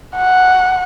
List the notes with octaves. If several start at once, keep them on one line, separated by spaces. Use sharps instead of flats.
F#5